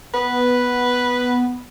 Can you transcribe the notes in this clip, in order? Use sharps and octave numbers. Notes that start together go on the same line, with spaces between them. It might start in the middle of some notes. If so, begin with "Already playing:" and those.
B3 B4